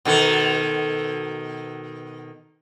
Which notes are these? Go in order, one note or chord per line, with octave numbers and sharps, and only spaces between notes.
B2 D#3 A4